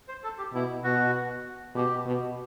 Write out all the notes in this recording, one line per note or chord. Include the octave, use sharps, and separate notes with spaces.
C5
A4
G4
B2 E4
B2 F#4
B2 G4
B2